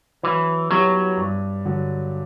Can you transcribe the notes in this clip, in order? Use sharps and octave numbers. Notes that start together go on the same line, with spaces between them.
E3 F#3
F#3 B3 E4 G4 C#5
G2
D3 F#3